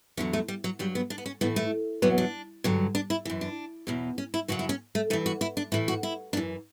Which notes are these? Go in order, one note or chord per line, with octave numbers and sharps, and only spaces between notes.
E2 D3 F#3 C#4
A3
G3
F#3
G2 F#3 G3
B3
D4
B3
C#4
A2 E3 B3
A3
E2 B2 F#3 B3
D4
G2 D3 F#3
D4
E4
F#2 E3
D4
E2 B2 F#3
C#4
E4
F#2 C#3 F#3 F#4
E4
C#4
A3
G2 E3 A3
F#4
E4
D4
A2 E3 E4
F#4
E4
F#2 E3 D4